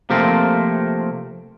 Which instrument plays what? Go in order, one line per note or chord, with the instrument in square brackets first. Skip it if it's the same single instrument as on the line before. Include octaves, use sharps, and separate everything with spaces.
[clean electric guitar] C3 F3 A3 A#3 C4